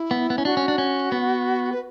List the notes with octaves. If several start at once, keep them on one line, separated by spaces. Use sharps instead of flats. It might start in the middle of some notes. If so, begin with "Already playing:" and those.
Already playing: E4
B3
B3
C#4
D4 F#4
C#4
D4
C#4
B3
B4